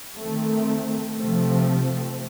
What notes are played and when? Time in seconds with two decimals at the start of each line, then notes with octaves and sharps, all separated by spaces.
0.17 D#3 A3 C4
1.17 C3 F3 A3 C4